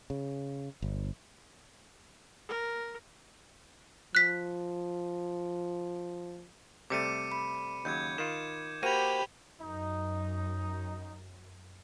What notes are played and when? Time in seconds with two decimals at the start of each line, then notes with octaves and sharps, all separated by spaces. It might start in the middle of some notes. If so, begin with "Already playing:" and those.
0.10 C#3
0.82 G1
2.49 A#4
4.15 F3 F#6 B6
6.90 C3 G3 A3 D6 C#7 D#7
7.32 B5
7.85 D#2 C#3 F#3 G6 G#6
8.18 D#3 F4 E7
8.83 A#3 F#4 G4 C5 G5 B5 D#7 F7
9.61 F#2 D#4